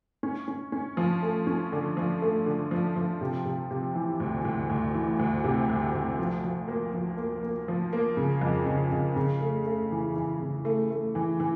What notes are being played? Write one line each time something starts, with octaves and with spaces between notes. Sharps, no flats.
C#4
C#4
C#4
F3
A3
C#4
D3
F3
A3
D3
F3
F3
C3
C3
C3
E3
D2
D2
D2
E3
D2
C3
D2
D2
F3
F3
A#3
F3
A#3
A#3
F3
A#3
C#3
F2
C#3
C#3
C#3
A3
A3
E3
E3
C#3
A3
A3
E3
E3